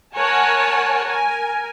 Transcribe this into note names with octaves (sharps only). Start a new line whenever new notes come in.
A#4 C#5 F#5 G#5 A5
A#4 G#5